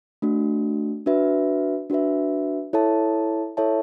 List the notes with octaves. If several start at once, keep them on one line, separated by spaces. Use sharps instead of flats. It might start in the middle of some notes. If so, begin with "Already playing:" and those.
A3 D4 F#4
D4 F#4 B4 E5
D4 F#4 B4 E5
E4 A4 C#5 E5 A5
E4 A4 C#5 E5 A5